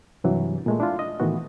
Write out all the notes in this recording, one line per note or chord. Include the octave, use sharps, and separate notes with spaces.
G2 C3 E3 F#3
A#2 G#3 A3
D4 E4 F4
D#5
A2 D#3 E3 B3 F#4